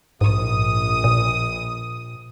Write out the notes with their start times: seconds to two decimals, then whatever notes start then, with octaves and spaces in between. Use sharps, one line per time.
0.21 A#1 G#2 D#6
1.04 A#2